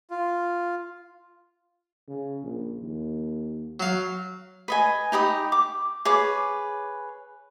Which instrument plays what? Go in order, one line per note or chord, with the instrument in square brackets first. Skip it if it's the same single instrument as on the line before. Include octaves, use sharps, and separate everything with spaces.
[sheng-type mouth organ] F4
[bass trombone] C#3
A#1
D#2
[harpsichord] F#3 F5
[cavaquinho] B4 D#5 G#5
D#4 G4 B5 D#6
D6
G#4 B4 C#5 D6